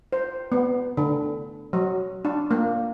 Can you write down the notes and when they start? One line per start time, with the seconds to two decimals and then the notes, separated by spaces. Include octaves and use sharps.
0.13 C5
0.52 B3
0.97 D3
1.73 F#3
2.25 D4
2.51 A#3